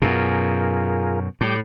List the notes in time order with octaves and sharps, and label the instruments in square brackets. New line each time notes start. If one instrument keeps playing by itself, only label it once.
[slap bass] F#2 B2 [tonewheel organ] F4 G#4 A#4
[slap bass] A2 [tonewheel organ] G3 D6 G6